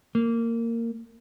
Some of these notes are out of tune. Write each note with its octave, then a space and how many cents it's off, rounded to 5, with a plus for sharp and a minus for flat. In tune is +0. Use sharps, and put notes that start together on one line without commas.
A#3 -15